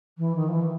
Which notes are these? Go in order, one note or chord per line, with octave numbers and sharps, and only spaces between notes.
E3
D#3
F3
E3